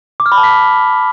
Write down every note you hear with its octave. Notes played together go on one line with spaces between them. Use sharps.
D6
F6
B5
A5
B6